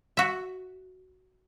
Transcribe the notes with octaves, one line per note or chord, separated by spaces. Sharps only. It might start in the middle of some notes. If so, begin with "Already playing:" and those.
F#4 E5